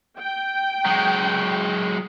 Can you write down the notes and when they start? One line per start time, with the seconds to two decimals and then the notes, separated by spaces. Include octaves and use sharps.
0.19 G5
0.86 F#3 G#3